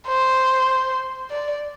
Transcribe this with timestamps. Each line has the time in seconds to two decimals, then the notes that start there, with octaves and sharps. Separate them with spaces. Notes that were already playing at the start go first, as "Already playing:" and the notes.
0.08 C5
1.31 D5